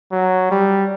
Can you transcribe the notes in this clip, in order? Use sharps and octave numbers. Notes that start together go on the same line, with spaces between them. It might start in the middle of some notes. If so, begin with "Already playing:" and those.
F#3
G3